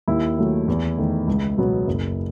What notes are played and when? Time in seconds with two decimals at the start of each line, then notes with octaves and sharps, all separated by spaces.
0.08 D#2 E4
0.38 D#3 F#3 A3
0.68 E2
0.98 D#3 A3
1.28 C#2
1.57 B2 F#3 B3
1.87 F#1